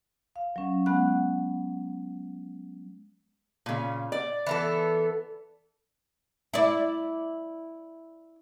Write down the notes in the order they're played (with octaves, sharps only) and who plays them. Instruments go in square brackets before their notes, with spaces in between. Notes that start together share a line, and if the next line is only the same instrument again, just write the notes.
[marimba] F5
F#3 C#4
G#3 B3 F#5 B5 F#6
[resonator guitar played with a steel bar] A#2 C#3
D5
[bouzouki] E3 B3 A4
[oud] E4 D5